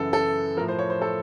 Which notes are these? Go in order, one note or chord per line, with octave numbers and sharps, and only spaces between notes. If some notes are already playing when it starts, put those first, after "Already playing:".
Already playing: F#2 C#3 E3 A4
A4
A2 F3 A#4
C5
C#5
C5
A4